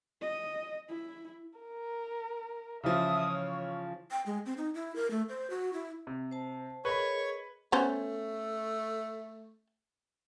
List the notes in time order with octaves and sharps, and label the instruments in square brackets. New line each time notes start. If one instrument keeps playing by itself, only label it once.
[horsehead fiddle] D#5
E4
[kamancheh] A#4
[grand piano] C#3 E3 F3 [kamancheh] E5 D#6
[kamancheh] C#5
[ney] G5
G#3
C4
D#4
E4
A#4
A3
C5
F#4
E4
[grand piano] C3
[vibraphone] C5 A5
[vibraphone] G#4 A#4 D#5 [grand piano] B4 B5 [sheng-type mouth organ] C#5 C#6
[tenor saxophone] A3 [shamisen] B3 C#4 C5